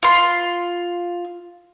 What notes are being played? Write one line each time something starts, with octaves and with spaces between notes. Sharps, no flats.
F4 C6